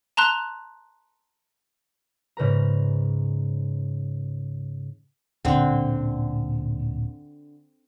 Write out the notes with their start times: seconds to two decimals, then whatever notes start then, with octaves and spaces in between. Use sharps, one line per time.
0.17 A5 A#5 C6 F#6
2.37 G#2 C#3 B4 A#5
5.45 D1 A#2 D3 C4 C#4